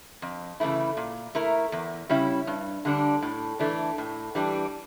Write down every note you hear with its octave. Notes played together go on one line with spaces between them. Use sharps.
F2
C#3 E3 A3 E4
A#2
A3 E4 A#4
E2
C#3 G3 C#4 E4
G2
D3 G3 D4
A2
E3 A3 D4
A2
E3 G3 D4